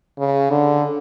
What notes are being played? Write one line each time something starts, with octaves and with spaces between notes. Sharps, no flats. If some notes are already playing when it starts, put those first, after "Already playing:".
C#3
D3